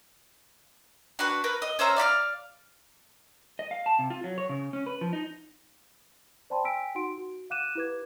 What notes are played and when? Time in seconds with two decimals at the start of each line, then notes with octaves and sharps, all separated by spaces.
1.19 D4 F#4 B4
1.44 A#4 B4
1.62 D#5
1.79 C#4 C5 E5 A#5
1.96 D5 F5 B5 F6
3.59 D#5
3.71 F5
3.86 A5
3.99 C3
4.10 F4
4.24 F#3
4.38 C#5
4.49 C#3
4.73 C#4
4.86 B4
5.01 F3
5.13 D#4
6.50 C5 D5 G5 A5 B5 C6
6.64 G5 G#5 E6 B6 D7
6.95 D#4 F#4 F#5 C6 D7
7.18 F#4
7.50 F5 F#5 D6 F#6 D#7 E7
7.75 E4 G4 B4 D6 G#6